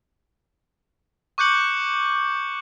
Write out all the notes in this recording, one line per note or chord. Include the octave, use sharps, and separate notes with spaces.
C#6 D6 F#6 G6 C#7 F#7